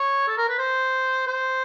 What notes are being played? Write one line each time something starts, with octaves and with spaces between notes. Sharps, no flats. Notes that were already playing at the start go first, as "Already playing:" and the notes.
Already playing: C#5
A4
A#4
B4
C5
C5